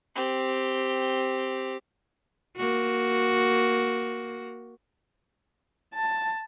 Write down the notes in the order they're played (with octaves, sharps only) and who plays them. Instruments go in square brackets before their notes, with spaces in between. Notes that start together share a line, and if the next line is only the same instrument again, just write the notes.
[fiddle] C4 G4
[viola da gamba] A#3 F#4
[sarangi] A5